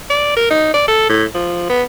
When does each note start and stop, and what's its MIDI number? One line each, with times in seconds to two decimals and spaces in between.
0.10 0.33 74
0.36 0.46 70
0.50 0.70 63
0.74 0.86 74
0.88 1.09 69
1.09 1.24 45
1.34 1.64 53
1.69 1.82 59